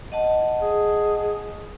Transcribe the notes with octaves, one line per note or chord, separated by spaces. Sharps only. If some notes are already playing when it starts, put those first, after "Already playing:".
D#5 F#5 A5
G#4